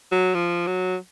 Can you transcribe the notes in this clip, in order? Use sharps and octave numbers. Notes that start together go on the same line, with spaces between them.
F#3
F3
F#3